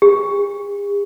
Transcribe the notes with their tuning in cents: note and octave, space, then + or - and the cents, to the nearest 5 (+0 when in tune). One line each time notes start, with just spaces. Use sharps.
G#4 -45